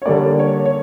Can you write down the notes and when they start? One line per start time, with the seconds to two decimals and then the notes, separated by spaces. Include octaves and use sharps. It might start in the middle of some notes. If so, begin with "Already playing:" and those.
0.02 C#5
0.06 D3 G3 A#3 D5
0.39 C#5
0.65 C#5